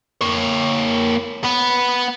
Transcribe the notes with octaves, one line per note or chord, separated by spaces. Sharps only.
A#3 C#5
B3